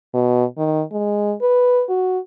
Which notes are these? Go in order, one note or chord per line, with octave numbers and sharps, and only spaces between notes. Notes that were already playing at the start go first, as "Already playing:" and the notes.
B2
D#3
G#3
B4
F#4